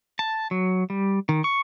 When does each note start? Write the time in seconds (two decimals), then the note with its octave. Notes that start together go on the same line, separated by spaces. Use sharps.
0.19 A5
0.51 F#3
0.90 G3
1.29 D#3
1.44 C#6